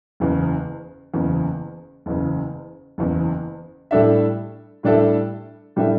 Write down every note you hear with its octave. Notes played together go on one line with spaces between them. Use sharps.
F#1 E2 C#3
F#1 E2 C#3
F#1 E2 C#3
F#1 E2 C#3
A2 G3 D4 A4 E5
A2 G3 D4 A4 E5
A2 G3 D4 A4 E5